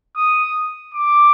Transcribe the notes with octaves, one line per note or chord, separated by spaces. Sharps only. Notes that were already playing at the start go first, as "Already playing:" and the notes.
D#6
D6